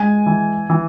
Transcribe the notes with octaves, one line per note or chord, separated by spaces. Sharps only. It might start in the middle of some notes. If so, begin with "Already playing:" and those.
Already playing: G#3 G#5
E3
E3